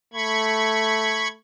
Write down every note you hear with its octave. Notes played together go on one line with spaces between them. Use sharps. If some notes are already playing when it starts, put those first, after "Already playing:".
A3 B5 C#6 G#6